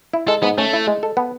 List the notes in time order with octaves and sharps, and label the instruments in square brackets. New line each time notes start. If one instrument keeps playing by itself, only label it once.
[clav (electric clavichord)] E4
[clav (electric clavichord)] G#3 [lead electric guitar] A4
[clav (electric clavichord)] G#2 [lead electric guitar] B3
[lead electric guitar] A3 [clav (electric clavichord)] C#4
[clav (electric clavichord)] E4
G#3
A4
B3